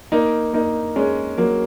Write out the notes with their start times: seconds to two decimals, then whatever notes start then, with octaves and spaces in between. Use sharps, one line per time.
0.12 A#3 D#4
0.53 A#3 D#4
0.96 G#3 C#4
1.38 F#3 A#3